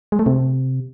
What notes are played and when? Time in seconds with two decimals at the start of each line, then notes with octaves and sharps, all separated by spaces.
0.12 G#3
0.19 A3
0.26 C3